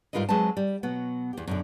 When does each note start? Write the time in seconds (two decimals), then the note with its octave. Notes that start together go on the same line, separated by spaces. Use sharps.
0.13 G#2 G3 F4 A#4 B4 D#5
0.29 F#3 G#3 C4 B4 C5 A5
0.57 G3
0.83 B2 F#3 B3
1.33 E2 G4
1.48 F#2 B2 D3